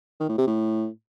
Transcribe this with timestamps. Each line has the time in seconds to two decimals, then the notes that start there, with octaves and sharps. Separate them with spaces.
0.20 D#3
0.29 A2
0.38 C3
0.47 A2